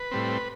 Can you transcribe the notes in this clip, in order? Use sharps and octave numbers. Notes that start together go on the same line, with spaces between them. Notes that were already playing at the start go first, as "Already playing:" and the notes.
Already playing: B4
A2 G3 C4